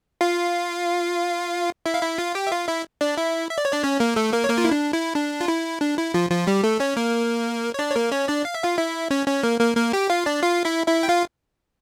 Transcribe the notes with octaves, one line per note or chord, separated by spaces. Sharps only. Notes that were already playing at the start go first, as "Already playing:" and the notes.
F4 F5
E4 E5
F5
E4 E5
F4 F5
G4 G5
E5
F4 F5
E4 E5
D4 D5
E4 E5
E5
D5
C#5
D4 D5
C#4 C#5
A#3 A#4
A3 A4
A#3 A#4
C#5
A#3 A#4
F4
E4
D4
E4
D4
F4
E4
D4
E4
F3 F4
F3 F4
G3 G4
A3 A4
C#4 C#5
A#3 A#4
C#5
D4 D5
C#5
A#3 A#4
C#4 C#5
D4 D5
F5
E5
F4 F5
E4 E5
C#4 C#5
C#4 C#5
A#3 A#4
A#3 A#4
A#3 A#4
G4 G5
F4 F5
D4 D5
F4 F5
E4 E5
E4 E5
G5
F4 F5